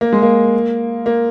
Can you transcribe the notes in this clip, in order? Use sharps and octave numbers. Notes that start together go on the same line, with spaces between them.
A#3
G#3
A#3
A#3